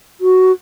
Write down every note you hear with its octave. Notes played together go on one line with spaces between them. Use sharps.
F#4